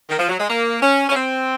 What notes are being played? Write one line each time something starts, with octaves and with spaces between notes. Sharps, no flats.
D#3
F3
F#3
G#3
A#3
C#4
C#4
C4